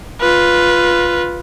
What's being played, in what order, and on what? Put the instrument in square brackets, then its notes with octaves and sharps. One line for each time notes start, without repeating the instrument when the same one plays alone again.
[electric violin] F4 B4